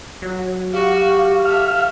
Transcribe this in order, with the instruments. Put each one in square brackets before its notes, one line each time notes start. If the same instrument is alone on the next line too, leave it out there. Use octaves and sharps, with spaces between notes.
[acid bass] F#3
[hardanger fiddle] F#4 [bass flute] G4 [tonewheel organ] F5
[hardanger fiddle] A4 E5 [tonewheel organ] F5 F6